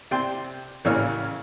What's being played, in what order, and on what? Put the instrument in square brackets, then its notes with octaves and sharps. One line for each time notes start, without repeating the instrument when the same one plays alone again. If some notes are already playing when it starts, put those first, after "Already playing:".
[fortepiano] C3 D5 G5 C6
A1 C#3 E3 A#3 C#5 F6